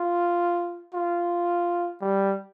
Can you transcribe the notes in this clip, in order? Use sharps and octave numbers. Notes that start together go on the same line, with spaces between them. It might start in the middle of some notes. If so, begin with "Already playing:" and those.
Already playing: F4
F4
G3